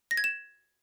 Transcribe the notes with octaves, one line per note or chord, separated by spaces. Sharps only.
A#6
G#6
E7